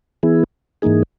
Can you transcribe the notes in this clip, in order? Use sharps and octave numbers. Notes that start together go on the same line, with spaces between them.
E3 B3 E4 G#4
G#2 E3 A#3 D#4 G#4